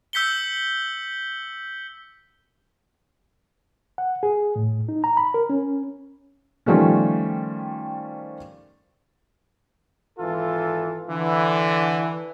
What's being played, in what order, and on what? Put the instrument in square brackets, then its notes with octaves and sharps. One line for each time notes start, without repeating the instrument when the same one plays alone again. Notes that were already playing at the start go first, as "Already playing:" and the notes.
[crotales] E6 G6 B6 C#7 G7
[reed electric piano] F#5
G#4
A2
D#4
A#5
B5
A#4
C#4
[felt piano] D#3 F3 G3 A3 C#4
[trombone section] G#1 E3 F4 A4
D3 E3